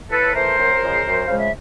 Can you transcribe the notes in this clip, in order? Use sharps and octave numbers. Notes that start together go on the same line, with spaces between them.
A2 A4 B4
E3 A3 A#4 C5
F#2
C#3 F3 G#3
F#2
C#3 F3 G#3 F5
E5